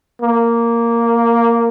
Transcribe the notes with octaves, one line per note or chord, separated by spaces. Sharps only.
A#3